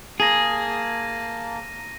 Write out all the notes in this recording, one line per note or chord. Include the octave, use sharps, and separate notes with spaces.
A#3 G#4 A5 A#6 D#7